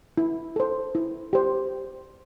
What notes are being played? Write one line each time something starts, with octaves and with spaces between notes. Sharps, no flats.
E4
A4 C5
E4
G4 C5